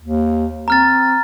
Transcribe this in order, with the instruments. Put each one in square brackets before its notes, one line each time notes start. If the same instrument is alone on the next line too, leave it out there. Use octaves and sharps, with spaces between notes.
[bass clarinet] D#2
[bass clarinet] C4 [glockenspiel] A#5 F6 A6